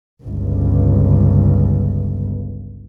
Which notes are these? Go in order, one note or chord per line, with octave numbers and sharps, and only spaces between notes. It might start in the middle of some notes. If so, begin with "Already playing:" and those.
G1 C#2